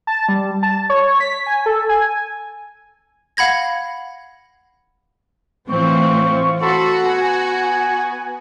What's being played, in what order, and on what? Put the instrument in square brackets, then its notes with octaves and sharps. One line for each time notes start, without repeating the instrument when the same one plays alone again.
[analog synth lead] A5
G3
A5
C#5
B6
G#5
A4
G#5
[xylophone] F5 F#5 B5 G#6 A#6
[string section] A2 E3 C4 [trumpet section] F4 C#6
[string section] F#4 [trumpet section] A4 B5 C6
[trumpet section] B3 G#5